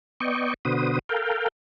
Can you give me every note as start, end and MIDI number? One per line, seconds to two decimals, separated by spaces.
0.20 0.54 59
0.20 0.54 74
0.20 0.54 75
0.20 0.54 79
0.20 0.54 85
0.65 0.99 47
0.65 0.99 50
0.65 0.99 66
0.65 0.99 71
0.65 0.99 72
0.65 0.99 87
1.09 1.48 69
1.09 1.48 70
1.09 1.48 77
1.09 1.48 79